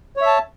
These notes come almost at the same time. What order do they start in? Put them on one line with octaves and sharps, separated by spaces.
C#5 E5 A5